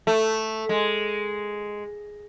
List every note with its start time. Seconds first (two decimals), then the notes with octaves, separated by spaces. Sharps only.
0.07 A3
0.69 G#3